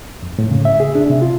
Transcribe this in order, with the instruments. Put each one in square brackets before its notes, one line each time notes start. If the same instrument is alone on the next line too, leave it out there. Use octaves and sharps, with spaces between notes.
[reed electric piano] F2
A2
C#3
E5
G#4
D4
C3
F4